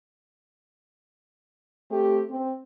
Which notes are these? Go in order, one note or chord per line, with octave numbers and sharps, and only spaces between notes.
A3 C4 G4
C4